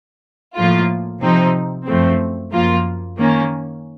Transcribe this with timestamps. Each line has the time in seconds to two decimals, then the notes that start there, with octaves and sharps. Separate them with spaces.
0.56 A2 F3 A#3 F4
1.21 C3 F3 C4 D#4
1.86 F#2 F3 A3 C4
2.51 F#2 F3 A#3 F4
3.17 D#3 A#3 C#4